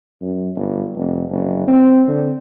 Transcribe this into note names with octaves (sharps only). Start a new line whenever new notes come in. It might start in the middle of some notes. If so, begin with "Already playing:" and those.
F#2
G1
F1
F#1
C4
D3